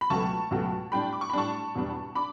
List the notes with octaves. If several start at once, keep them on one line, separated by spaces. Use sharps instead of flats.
B5
C#2 B2 F#3 A3 A5 C#6
C#2 B2 F#3 A3
A2 G3 D4 G5 B5
D6
C#6
B5
A2 G3 D4 A5 C#6
E2 B2 G3 D4
D4 B5 D6